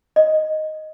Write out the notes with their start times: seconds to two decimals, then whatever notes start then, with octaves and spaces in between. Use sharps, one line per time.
0.16 D#5